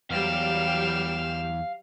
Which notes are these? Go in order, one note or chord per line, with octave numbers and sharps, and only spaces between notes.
E2 F#3 G3 F5 G5 F6 E7